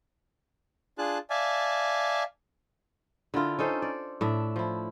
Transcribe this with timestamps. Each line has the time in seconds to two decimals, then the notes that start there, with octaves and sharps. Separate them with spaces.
0.98 D4 F4 G#4 A5 F#6
1.30 D5 E5 F5 G#5 A5
3.34 D3 E4 F4 A#4
3.59 C#4 D#4 A4 C5
3.82 D5
4.21 A2 D4 E5
4.56 F3 E4